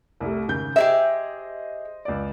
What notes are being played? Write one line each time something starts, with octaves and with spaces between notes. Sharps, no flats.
C2 G3 A3
G#1 C#3 G6
G4 G#4 C5 D#5 E5
C#2 D5